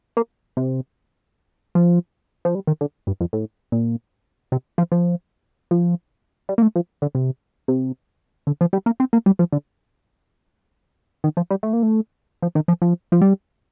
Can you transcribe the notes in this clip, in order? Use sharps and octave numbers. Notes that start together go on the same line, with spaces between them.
A#3
C3
F3
F3
G3
D#3
D3
G2
F2
A2
A#2
C3
F3
F3
F3
G3
A#3
A3
F3
D3
C3
C3
D3
F3
G3
A#3
C4
A#3
G3
F3
D3
D#3
F3
G3
A3
A#3
A3
F3
D#3
F3
F3
F3
G3